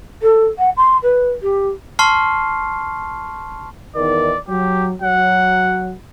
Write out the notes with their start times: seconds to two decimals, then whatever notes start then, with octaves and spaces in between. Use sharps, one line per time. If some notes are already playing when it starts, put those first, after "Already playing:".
0.22 A4
0.58 F#5
0.77 C6
1.03 B4
1.42 G4
1.99 A5 C6 C#6 F6 C7
3.96 E2 D#3 A#4 D5
4.48 F#3 G4
5.02 F#3 F#5